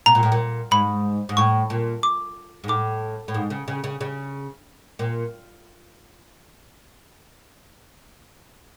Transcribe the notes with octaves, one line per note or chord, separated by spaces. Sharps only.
B2 A#5
A#2
A2
A#2
G#2 B5
G#2
A2 C#6
A#2
D6
G#2
A2 D6
A2
G#2
C#3
C#3
C#3
C#3
A#2